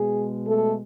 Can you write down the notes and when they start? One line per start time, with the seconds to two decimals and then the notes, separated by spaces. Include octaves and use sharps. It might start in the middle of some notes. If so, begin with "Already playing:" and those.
Already playing: B2 G#3 G#4
0.46 A3 A4